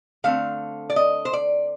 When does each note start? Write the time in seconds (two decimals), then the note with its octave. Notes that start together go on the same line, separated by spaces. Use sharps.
0.24 D3 A3 C4 F5
0.90 D5
0.96 D#5
1.25 C5
1.33 D5